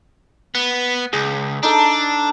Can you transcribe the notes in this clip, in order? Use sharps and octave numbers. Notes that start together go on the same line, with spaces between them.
B3
C#2 G#4
D4 D#4 A4